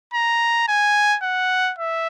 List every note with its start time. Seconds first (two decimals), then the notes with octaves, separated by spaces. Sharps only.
0.14 A#5
0.68 G#5
1.23 F#5
1.79 E5